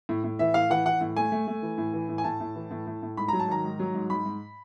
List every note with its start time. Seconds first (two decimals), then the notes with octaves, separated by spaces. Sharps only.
0.09 A2
0.24 A2
0.39 E3 E5
0.54 A2 F5
0.70 E3 F#5
0.86 E3 F#5
1.01 A2
1.16 A3 G#5
1.32 A3
1.48 A3
1.62 E3
1.78 A2
1.93 E3
2.09 A2
2.18 G#5
2.24 A2 A5
2.40 A2
2.55 E3
2.71 A2
2.87 A2
3.02 A2
3.17 G#2 B5
3.28 F#3 A#5
3.40 A5
3.48 D#3 A#5
3.64 G#2
3.79 F#3
3.94 G#2
4.10 G#2 B5
4.26 G#2